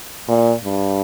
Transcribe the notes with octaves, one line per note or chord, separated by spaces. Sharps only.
A#2
G2